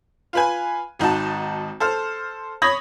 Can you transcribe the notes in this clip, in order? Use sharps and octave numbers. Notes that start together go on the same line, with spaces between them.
F4 B4 G#5
G#1 D#4 F#4 A5
A4 C5 F6
C#5 B5 D#6 G#6 A#6